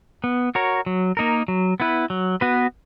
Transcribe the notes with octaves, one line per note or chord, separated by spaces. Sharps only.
B3
F#4 A#4 C#5
F#3
A#3 D#4 A#4
F#3
B3 E4 B4
F#3
B3 F#4 B4